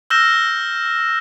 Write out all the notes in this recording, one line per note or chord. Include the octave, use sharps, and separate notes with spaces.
E6 F6 G6 A#6 E7 G7